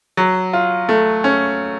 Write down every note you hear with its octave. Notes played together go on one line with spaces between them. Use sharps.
F#3
F4
A3
C#4